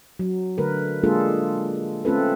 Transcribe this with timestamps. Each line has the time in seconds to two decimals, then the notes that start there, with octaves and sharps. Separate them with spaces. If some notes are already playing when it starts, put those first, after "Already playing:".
0.19 F#3
0.58 D3 A3 A#4 B4
1.03 G#3 A#3 D4 F4 G#4 A4
2.05 A3 C4 C#4 F4 A4 B4